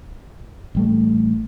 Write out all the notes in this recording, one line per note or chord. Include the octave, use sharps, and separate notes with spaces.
A1 G3 A3